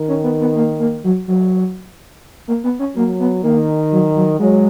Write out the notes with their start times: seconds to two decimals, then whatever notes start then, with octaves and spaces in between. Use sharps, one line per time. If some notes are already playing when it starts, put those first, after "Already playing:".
Already playing: D#3
0.08 C#4
0.24 B3
0.41 B3
0.56 A#3
0.79 A#3
1.04 F#3
1.28 F#3
2.48 A#3
2.64 B3
2.79 C#4
2.96 F#3 A#3
3.20 B3
3.43 D#3 A#3
3.92 F#3
4.16 F#3
4.39 F#3 G#3